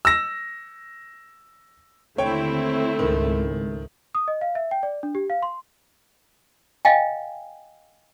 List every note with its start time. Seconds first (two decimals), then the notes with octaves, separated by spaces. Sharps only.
0.05 E6 A#6
2.18 D#2 D3 A3 C4 E4 C#5 G5
2.99 C#2 G#2 D#3
4.15 D#6
4.28 D#5
4.41 F5
4.55 E5
4.71 G5
4.83 D5
5.03 D4
5.15 G4
5.30 F5
5.42 C6
6.85 D#5 F5 G5 G#5